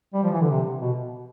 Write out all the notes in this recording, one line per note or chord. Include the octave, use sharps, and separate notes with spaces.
G3
F3
E3
D3
C3
B2